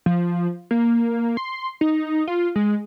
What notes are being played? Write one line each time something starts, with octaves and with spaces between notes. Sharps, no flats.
F3
A#3
C6
D#4
F4
G#3